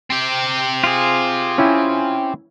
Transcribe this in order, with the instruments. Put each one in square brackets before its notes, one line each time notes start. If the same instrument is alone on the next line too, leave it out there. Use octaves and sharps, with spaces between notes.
[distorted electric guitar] C4 G4
[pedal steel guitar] F4 G#4
[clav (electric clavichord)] C#4 E4 G5